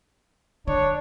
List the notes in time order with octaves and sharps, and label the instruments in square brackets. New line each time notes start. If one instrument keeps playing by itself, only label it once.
[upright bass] D3 [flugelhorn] D4 [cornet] C#5